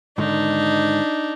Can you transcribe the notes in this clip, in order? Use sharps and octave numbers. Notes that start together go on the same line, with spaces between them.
G#2 D3 D#3 D4 D#4